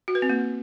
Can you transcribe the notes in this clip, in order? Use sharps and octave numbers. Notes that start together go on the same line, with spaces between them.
F#4
B4
C4
A#3